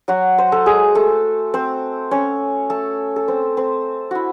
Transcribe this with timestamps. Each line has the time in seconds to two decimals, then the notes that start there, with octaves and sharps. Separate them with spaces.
0.08 F#3 F#4
0.38 C5
0.52 A4
0.66 G#3 G#4
0.95 A3 A4
1.54 C4 C5
2.11 C#4 C#5
2.70 A3 A4
3.16 A4
3.28 C4 C5
3.57 C4 C5
4.11 E4 F#4